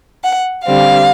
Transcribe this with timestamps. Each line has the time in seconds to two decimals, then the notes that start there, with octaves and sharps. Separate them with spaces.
0.24 F#5
0.66 D3 G3 C4 F5